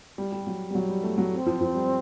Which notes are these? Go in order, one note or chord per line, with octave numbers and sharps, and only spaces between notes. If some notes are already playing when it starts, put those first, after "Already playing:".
G3
G3
F#3
G3
F#3
G3
A3
F#3
C4
F3
F3
G3